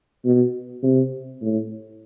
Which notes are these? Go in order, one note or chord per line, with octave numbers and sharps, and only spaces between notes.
B2
C3
A2